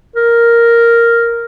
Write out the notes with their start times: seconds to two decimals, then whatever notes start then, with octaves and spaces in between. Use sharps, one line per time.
0.16 A#4